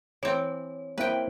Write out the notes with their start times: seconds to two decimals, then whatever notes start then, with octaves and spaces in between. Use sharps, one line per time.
0.23 E3 C4 C#5
0.98 A#3 C4 E4 B4 G5